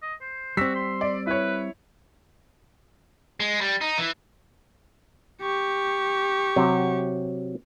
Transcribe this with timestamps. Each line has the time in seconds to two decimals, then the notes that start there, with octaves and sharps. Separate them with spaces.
0.02 D#5
0.21 C5
0.57 G3 C4 F#4 E6 B6
0.76 C6
1.01 D5
1.27 E4 B4 C#5
3.40 G#3
3.61 G3
3.81 D#4
3.98 E3
5.41 G4 C#6
6.56 C3 F#3